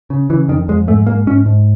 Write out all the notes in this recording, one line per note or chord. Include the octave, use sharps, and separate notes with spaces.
C#3
C#3 E3
F2 D#3
F2 G#3
G#2 A3
G#2 A#3
G#2 C#4
G#2